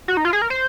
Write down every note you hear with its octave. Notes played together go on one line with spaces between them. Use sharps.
F#4
D#4
F4
G#4
A#4
C5